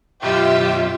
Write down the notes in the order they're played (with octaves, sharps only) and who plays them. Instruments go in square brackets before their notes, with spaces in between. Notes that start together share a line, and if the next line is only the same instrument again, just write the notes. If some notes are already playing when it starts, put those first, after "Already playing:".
[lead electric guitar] B1 F#2 [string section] F4 G4 E5